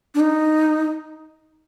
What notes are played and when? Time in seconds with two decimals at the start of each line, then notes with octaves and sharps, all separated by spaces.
0.15 D4
0.20 D#4